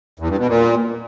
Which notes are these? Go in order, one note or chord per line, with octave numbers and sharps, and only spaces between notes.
E2
G2
B2
A#2